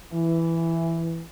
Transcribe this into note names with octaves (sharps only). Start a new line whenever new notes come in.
E3